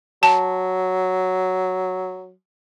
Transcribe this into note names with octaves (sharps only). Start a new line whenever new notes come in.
F#3 A5